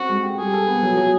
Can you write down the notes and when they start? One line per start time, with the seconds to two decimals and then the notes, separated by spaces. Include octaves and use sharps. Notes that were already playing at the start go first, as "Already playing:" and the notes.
Already playing: C4 F#4
0.09 G#3
0.23 G4
0.38 G3 G#4
0.53 A4
0.67 B3
0.83 F#3
0.97 F#3